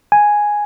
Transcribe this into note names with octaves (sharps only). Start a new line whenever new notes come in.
G#5